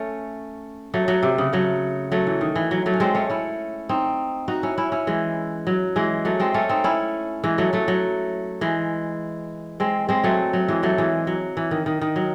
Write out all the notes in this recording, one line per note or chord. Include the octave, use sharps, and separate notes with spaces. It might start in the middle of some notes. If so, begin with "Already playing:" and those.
Already playing: A3 C#4
F#3 A3
F#3
C3
C#3
F#3 A3
F#3 A3
E3
D#3
E3
F#3
F#3 A3
C#4
G#3 C4
A3 C#4
C#4 E4
C4 D#4
D#4 F#4
C#4 E4
C#4 E4
C#4 E4
E3 G#3
F#3
E3 G#3
F#3 A3
G#3 C4
A3 C#4
C4 D#4
C#4 E4
E3 G#3
F#3 A3
F#3 A3
F#3
E3 G#3
G#3 C4
G#3 C4
F#3 A3
F#3
E3 G#3
F#3 A3
E3 G#3
F#3
E3
D#3
D#3
D#3
F#3